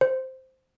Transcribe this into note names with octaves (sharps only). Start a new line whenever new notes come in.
C5